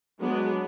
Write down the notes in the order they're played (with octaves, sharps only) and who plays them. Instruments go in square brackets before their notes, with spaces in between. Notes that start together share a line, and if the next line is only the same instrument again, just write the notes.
[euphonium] F#3 [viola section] G#3 B3 D4